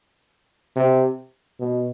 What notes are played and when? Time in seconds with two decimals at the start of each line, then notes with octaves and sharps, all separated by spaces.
0.76 C3
1.60 B2